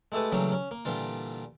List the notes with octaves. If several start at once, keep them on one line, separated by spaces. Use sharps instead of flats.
G#3 A3 E4 G4 A4 B4
C#3 E3 F#3 G3 A3 A#3
C#4
A#3
A#2 D3 E3 G3 F4